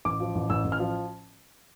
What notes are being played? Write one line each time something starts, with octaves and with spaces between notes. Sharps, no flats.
A1 D6
F3
A1
A1 E6
A1
F6
F3